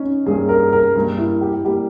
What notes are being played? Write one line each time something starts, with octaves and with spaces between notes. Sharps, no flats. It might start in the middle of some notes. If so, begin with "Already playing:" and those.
Already playing: C#4 D#4
G2 G3 A#3 G#4
A#4
A#4
G2 G3 A#3
E4
G4
G3 A#3 G4